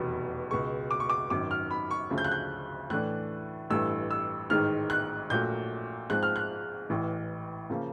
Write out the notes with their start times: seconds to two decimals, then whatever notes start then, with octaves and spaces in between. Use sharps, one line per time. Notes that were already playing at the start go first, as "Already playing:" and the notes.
Already playing: F1 E2 B2 F#3 B3
0.51 C#2 B2 G#3 C#6
0.91 D6
1.00 C#6
1.10 D6
1.30 G#1 F#2 D#3 D6
1.51 F6
1.71 B5
1.91 C#6
2.10 D2 C#3 F3
2.18 G6
2.24 F#6
2.31 G6
2.90 A2 E3 A3 D4 F#6
3.70 A1 G2 E3 A3 E6
4.10 E6
4.50 A1 G#2 D#3 G#3 F6
4.90 F#6
5.30 A#1 A#2 F#3 A3 G6
6.10 G#2 F3 G#3 C4 F#6
6.23 F6
6.36 F#6
6.90 A1 A2 E3
7.70 C#3 F3 A#3